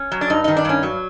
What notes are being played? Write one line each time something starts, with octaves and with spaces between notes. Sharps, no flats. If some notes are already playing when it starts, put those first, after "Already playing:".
Already playing: C#4
F#3
D4
G2 D#4
D#3 D#4
D4
G2 C#4
F#3